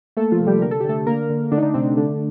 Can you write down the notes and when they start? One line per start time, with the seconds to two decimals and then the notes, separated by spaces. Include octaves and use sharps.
0.17 A3 A#3 A4
0.32 F3 F4
0.40 C3
0.47 G3 G4
0.62 D3 A#4
0.71 A4
0.80 G4
0.85 D3 A3 A4
1.07 D3 A#3 A#4
1.30 D3
1.52 D3 A3 D4
1.58 D#4
1.63 D3 D4
1.74 C3 C4
1.85 C4
1.97 D3 A3 D4